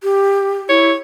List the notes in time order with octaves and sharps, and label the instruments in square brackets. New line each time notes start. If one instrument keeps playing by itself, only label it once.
[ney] G4
[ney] E4 [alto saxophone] C#5